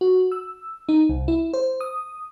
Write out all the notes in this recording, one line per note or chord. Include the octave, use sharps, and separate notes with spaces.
F#4
E6
D#4
C2
E4
C5
D#6